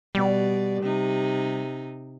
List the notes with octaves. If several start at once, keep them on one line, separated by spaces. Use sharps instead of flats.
B2 G3 D5
C3 D#4